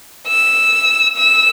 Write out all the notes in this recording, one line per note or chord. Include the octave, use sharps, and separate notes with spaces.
E6
E6